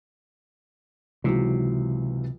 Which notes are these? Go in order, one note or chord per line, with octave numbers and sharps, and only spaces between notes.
C#2 C3 E3 F#3